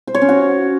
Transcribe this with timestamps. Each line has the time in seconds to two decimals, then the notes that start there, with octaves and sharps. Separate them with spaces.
0.07 C5
0.15 C#5
0.22 C#4
0.29 F#4